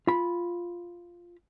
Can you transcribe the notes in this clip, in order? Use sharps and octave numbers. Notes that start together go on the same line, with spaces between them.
F4 B5